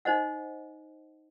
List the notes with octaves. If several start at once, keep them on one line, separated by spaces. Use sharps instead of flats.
D#4 C5 D#5 F#5